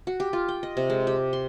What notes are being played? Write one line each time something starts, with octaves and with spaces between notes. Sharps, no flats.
F#4
G4
F4
G5
D#5
C3
G#3
G4
C6